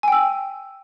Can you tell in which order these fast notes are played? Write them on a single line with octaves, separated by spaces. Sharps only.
G#5 G5 E6